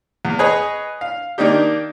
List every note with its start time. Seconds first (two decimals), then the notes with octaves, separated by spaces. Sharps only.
0.25 E2
0.39 G#4 B4 C#5 D#5
1.01 F5
1.38 D#3 A#3 D4 D#4 G4